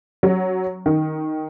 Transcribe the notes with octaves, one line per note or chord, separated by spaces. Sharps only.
F#3
D#3